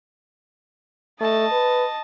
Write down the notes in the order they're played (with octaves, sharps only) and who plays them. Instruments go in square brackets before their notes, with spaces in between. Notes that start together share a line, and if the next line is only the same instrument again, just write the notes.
[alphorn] A3 [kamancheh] D#5 A5
[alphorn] B4